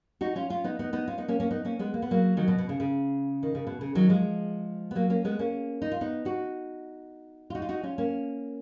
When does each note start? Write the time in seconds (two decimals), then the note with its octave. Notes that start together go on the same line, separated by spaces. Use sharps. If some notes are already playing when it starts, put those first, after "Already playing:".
0.21 D#4 F#4
0.36 C#4 F4
0.50 C#4 F4
0.64 B3 D#4
0.79 B3 D#4
0.93 B3 D#4
1.07 C#4 F4
1.18 B3 D#4
1.28 A#3 C#4
1.40 A#3 C#4
1.51 B3 D#4
1.65 A#3 C#4
1.79 G#3 B3
1.94 A#3
2.02 B3
2.11 F#3 A#3
2.37 D#3 F#3
2.48 B2
2.58 B2
2.69 C#3
2.80 C#3
3.43 D#3
3.55 C#3
3.67 B2
3.81 C#3
3.95 D#3 F#3
4.09 F3 G#3
4.91 B3
4.95 F#3 A#3
5.10 A#3 C#4
5.25 G#3 B3
5.39 A#3 C#4
5.82 D#4
5.92 F4
6.01 B3 D#4
6.25 D#4 F#4
7.50 F4
7.55 D#4 F#4
7.62 F4
7.69 D#4 F#4
7.83 C#4 F4
7.98 A#3 C#4